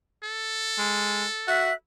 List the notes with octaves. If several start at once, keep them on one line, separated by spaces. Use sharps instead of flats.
A4
G#3
F#4 E5 F#6